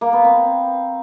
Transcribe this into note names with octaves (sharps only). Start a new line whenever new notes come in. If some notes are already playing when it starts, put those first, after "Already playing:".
A#3
B3
C4